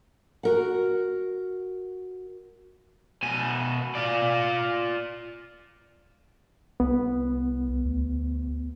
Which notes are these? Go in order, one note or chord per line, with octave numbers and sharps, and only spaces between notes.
F#4 A#4 F#5
B2 G#5
F4 D5
C2 B3
D2